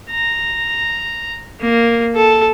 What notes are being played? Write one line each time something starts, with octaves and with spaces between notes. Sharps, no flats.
A#5
A#3
A4